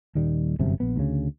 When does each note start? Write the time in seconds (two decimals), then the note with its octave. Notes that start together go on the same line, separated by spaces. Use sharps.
0.15 D#1 D#3 G3
0.59 G1 F#2 C3
0.80 A#1 B3
0.96 D2 C#3